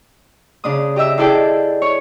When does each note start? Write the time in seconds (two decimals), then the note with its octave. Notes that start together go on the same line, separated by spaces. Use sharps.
0.64 C#3 D4 D#6
0.96 G4 D#5 E5 E6
1.18 D4 E4 G#4 A4 D5 G5
1.82 C#5